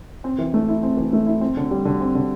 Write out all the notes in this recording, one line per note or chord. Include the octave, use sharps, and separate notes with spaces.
C4
E3
A3
E4
C4
E3
A3
E4
C4
D3
G3
D3
C4
D3